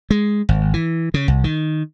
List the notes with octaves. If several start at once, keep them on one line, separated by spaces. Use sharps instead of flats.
G#3
G#1
E3
C#3
C2
D#3